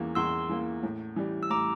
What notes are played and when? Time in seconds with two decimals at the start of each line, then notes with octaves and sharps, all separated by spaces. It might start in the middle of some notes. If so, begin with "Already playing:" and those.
Already playing: E2 E3 A#3
0.15 E2 C6 E6
0.49 E3 A#3
0.83 A2
1.16 E3 G3
1.43 E6
1.50 A2 A#5 D6